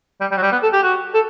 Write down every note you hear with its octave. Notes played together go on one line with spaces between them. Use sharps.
G3
G3
F#3
G3
B3
A4
G4
F#4
A4